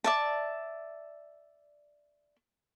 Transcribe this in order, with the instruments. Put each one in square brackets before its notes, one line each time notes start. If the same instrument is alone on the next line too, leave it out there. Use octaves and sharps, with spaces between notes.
[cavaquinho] D5 E5 A5